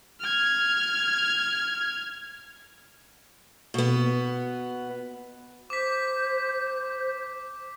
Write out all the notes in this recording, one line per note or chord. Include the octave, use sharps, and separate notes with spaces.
F6 G#6
B2 B3
C5 D6 B6